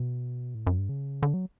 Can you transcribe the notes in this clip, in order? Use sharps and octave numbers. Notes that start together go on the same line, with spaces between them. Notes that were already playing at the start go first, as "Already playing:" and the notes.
Already playing: B2
A2
F#2
G2
C#3
D3
F#3